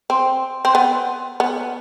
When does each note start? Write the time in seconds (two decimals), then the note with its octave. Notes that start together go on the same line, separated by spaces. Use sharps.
0.10 C4
0.65 C4
0.75 B3
1.40 B3